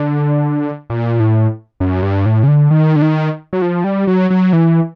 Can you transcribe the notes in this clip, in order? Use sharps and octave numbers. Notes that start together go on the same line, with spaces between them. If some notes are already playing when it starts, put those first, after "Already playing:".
Already playing: D3
A#2
A2
F#2
G2
A2
C#3
D3
D#3
D3
D#3
F#3
F3
G3
F#3
F#3
E3